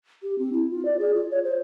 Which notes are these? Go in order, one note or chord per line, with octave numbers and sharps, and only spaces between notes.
G4
C4
E4
F4
D5
G#4
F4
C#5
C5